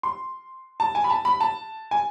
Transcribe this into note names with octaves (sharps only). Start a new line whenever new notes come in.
C6
A5
G#5
B5
A5
B5
A5
G#5